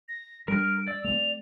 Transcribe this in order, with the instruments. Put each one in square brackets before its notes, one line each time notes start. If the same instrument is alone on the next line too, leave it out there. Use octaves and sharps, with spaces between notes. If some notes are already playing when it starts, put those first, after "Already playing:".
[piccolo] A#6
[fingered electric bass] G3 D4 [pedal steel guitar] A#4 F6 [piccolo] D7
[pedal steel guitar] D5 [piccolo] E6
[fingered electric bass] A3 B3 C4 [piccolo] F7